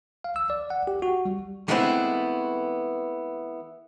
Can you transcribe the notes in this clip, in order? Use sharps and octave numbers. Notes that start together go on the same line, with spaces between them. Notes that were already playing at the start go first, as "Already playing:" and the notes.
F5
E6
D5
F#5
G4
F#4
G3
E3 G#3 A3 B3 C4 E4